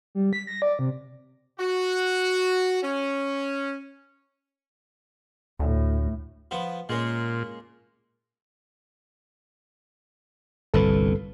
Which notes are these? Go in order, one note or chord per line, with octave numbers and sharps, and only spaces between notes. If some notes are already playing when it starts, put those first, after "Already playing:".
G3
B6
A#6
D5
C3
F#4
C#4
D2 A2
F3 B3
A#2 G#3 A#3 C#4
G1 C2 A#2 A4 B4